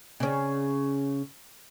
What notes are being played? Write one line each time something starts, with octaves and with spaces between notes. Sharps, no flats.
C#3 C#4